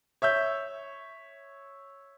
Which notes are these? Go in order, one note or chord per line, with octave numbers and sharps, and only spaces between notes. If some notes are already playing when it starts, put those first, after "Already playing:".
C#5 E5 E6 G6